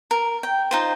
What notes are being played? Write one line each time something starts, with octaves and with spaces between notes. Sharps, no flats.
A#4
G5
D#4 F4 C5